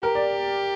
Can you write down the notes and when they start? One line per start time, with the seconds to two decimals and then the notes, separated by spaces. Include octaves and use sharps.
0.03 G4 A#4
0.15 D5